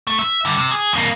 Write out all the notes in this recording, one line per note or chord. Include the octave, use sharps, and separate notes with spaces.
A3
E5
G2 D3
C3
G#4
F2 A#3